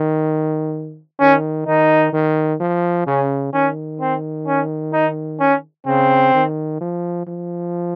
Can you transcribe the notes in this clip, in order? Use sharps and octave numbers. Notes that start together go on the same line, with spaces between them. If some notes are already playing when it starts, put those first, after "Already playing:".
Already playing: D#3
D#3 C#4
D#3 D#4
D#3
F3
C#3 C#4
D#3 C#4
C4
C#4
D#4
C#4
C#3 C4
D#3
F3
F3